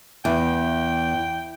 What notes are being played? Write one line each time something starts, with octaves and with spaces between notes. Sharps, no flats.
E2 G5